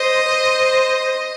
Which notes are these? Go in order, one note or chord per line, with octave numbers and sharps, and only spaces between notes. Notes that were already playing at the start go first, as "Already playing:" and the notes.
Already playing: C5 D#5
C5